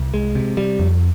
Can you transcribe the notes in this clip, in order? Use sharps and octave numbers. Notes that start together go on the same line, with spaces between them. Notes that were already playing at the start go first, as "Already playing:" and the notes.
Already playing: C2
G#3
C3
G3
F2